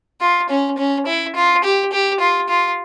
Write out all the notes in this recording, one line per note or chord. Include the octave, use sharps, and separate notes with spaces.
F4
C#4
C#4
E4
F4
G4
G4
F4
F4